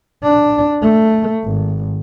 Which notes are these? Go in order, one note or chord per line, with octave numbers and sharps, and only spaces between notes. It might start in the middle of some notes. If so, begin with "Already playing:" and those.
D4
A3
G#1